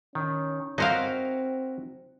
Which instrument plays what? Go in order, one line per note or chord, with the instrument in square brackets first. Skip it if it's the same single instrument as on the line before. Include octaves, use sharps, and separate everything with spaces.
[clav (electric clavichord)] D#3 [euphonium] C#4
[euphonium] C4 [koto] D#4 C5 F5 [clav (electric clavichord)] E4 F#4 A#4